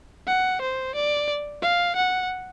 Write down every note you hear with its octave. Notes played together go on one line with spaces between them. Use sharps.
F#5
C5
D5
F5
F#5